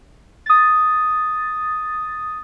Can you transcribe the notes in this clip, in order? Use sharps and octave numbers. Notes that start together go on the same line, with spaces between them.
D#6 A6